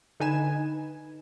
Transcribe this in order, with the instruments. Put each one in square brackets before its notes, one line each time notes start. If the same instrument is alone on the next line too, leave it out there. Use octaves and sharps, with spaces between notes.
[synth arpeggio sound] D3 D#4 B4 G#5 G#6 E7